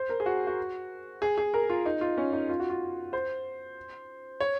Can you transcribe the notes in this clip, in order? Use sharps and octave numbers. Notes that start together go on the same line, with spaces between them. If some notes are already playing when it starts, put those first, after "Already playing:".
Already playing: C5
A#4
G#4
F#4
F#4
G#4
G#4
A#4
F4
D#4
F4
C#4
D#4
F4
F#4
F4
C5
C#5